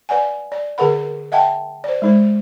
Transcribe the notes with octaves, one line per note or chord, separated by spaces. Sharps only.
B4 D5 F#5 G#5
D5
D3 G#4 A#4 B4 F#5 B5
D#5 E5 F#5 G5 A5
C5 D5
G#3 D#4 C5